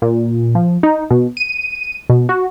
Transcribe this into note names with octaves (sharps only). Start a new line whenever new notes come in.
A#2
F3
D#4
B2
D#7
B2
F#4